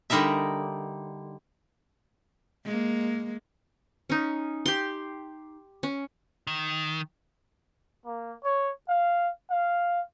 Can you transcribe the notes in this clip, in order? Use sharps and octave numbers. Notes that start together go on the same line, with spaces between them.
D3 G3 D#4 A#4 E5
G#3 A#3
C#4 D#4
G4 C6
C#4
D#3
A#3
C#5
F5
F5